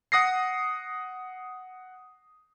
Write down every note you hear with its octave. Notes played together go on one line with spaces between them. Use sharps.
F#5 D#6 A#6 C7